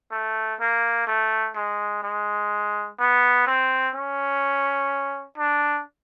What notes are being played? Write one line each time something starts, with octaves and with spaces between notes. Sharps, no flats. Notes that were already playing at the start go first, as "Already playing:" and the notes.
A3
A#3
A3
G#3
G#3
B3
C4
C#4
D4